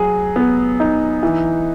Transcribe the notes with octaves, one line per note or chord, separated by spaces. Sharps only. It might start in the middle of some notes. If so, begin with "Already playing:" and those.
Already playing: F#3 G#4
B3
D#4
E3